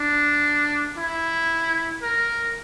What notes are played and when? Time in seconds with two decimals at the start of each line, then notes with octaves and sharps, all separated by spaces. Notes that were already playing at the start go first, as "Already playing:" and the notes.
Already playing: D4
0.98 E4
2.03 A#4